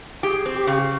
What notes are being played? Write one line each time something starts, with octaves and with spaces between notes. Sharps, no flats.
G4 G#4
C4
G4
C#3